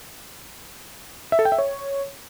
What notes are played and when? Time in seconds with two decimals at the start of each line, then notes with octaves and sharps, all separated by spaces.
1.32 E5
1.39 A4
1.45 G5
1.52 E5
1.58 C#5